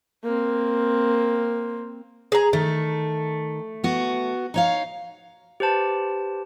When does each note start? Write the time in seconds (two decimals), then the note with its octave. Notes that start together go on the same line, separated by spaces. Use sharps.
0.24 A#3 C4
2.32 G#4 A#5
2.53 D#3 A3
3.84 B3 F#4
4.54 D#4 C#5 F5
5.60 G4 B4 C5 A5